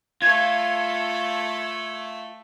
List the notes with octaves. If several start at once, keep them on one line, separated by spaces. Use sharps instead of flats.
A3 F4 A4 G#6